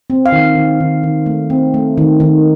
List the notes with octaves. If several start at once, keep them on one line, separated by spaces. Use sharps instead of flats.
C4
F5
D#3
D#3
D#3
D#3
A3
C4
A3
D#3
D#3